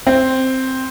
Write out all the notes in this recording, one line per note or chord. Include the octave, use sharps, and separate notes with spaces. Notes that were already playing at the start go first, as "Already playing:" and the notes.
C4